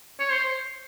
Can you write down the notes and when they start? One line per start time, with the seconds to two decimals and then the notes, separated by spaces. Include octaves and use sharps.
0.20 C#5
0.32 C5